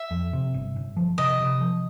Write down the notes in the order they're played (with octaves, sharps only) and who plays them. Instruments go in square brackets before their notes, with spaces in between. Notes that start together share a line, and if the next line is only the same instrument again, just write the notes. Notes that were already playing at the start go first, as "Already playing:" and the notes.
Already playing: [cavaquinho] E5
[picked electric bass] F2
C3
G1
G1
F3
[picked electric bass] C3 [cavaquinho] D#5
[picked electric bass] C3
F3